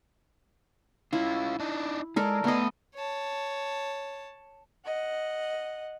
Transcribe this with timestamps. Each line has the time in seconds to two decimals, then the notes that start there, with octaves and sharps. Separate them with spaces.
1.13 C#4 E4 F4
1.60 D4 D#4
2.16 G#3 A4 A#4 D5
2.44 A3 B3 D#5 A#5
2.95 C#5 A5
4.85 D#5 F#5